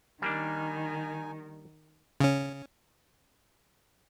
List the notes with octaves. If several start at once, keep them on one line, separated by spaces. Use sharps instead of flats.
D#3 G3 A#3 D4 D#4 G#5
C#3 C#4